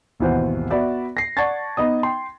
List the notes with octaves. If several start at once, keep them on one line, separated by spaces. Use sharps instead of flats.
G#1 D#2 B2 E3 C5 F#5
B3 F#4 D5 E5
A#6 C7
D5 F#5 A5 C#6 G#6 A6
B3 D#4 D#5 D#6
G5 C6